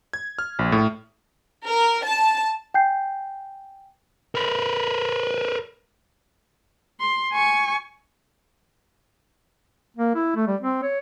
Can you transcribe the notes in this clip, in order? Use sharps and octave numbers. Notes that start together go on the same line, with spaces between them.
G#6
F6
A#1
A2
A#4
A5
G5 G#5 G6 C7
A#4 B4
C6
G#5 C#6
A#3
E4
A3
G3
C4
C#5